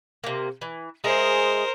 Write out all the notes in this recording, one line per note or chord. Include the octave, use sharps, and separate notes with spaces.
C3 A#3
E3
G#3 G#4 A#4 C5 E5